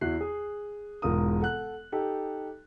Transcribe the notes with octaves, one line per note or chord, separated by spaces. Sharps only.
E2 E4 F#4 F#6 C7
G#4
E1 G#2 F4 A#4 D#6
A4 F#5 F#6
D#4 G4 A4